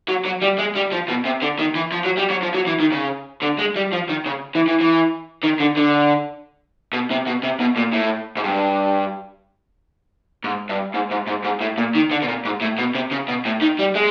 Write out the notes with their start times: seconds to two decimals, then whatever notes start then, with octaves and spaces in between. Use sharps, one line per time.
0.08 F#3
0.25 F#3
0.42 G3
0.58 G#3
0.75 G3
0.92 F3
1.08 B2
1.25 C3
1.42 D3
1.59 D#3
1.75 E3
1.92 F3
2.05 F#3
2.17 G3
2.30 F#3
2.42 F3
2.54 F#3
2.67 E3
2.80 D#3
2.92 C#3
3.42 D3
3.59 G#3
3.76 G3
3.93 F3
4.10 D#3
4.26 C#3
4.55 E3
4.68 E3
4.80 E3
5.43 D#3
5.60 D3
5.77 D3
6.93 B2
7.11 C3
7.27 B2
7.43 C3
7.60 B2
7.77 A#2
7.93 A2
8.37 G#2
8.44 G2
10.44 G#2
10.69 G2
10.94 G#2
11.11 G#2
11.28 G#2
11.45 G#2
11.61 A2
11.78 A#2
11.95 D#3
12.11 D3
12.22 B2
12.28 A#2
12.45 G#2
12.61 A2
12.78 B2
12.95 C3
13.11 C#3
13.28 B2
13.45 A2
13.61 D#3
13.79 G3
13.95 G#3